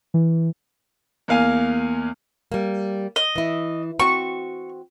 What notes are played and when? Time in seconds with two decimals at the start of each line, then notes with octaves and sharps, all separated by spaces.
0.14 E3
1.28 E2 A#3 F5 G#5
2.52 G3 A#3
3.16 D#5
3.36 E3 E4
3.99 C4 F#4 C#6